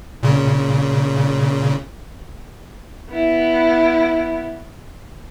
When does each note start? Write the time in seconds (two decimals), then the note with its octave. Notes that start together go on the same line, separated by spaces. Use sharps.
0.23 A#2 C#3
3.10 B3 E4